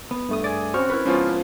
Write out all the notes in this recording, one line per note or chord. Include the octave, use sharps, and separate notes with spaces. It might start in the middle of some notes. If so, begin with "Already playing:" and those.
B3
G2 A3 D#6
G#4 D5 A6
C4 C#4 F#4 C5 C#6 F6
E4 A#4 B4
G#2 F3 B3 C#4 F4